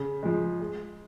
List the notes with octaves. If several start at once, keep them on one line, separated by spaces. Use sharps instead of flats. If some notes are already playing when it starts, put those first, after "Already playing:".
Already playing: C#3
F3 G#3
G#3